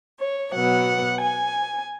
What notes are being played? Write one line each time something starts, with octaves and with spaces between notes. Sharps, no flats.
C#5
B2 F#3 B3 F#5
G#5